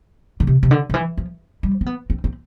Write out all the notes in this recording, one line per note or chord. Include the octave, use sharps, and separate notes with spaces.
D3
C3
C3
D3
D3
E3
F3
G3
C4
B3
C4
C4